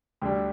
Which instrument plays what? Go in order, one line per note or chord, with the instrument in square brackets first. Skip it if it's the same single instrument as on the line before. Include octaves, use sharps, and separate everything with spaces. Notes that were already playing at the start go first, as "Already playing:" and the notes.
[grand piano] D2 D3 G3 D4 G4